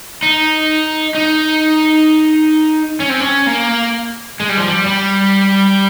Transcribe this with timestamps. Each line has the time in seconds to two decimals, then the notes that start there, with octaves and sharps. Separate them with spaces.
0.22 D#4
1.15 D#4
3.00 C#4
3.09 C4
3.20 C#4
3.47 A#3
4.40 G#3
4.49 G3
4.57 F3
4.68 G3
4.86 G3